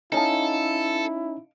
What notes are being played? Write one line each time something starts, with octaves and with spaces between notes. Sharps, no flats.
C#4 D#4 E4 A4 D#5 F5 A5